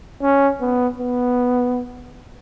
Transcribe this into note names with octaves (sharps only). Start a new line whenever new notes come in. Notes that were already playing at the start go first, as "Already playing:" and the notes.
C#4
B3
B3